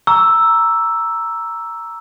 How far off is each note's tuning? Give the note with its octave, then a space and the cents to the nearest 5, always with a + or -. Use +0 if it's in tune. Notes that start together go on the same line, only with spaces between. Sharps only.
A#5 +0 C#6 +40 E6 +0